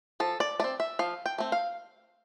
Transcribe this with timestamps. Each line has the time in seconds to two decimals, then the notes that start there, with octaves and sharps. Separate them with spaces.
0.20 F3 A4
0.40 D5
0.60 A3 D5
0.64 C4
0.80 E5
0.99 F3 F5
1.26 G5
1.38 A3 C4
1.52 F5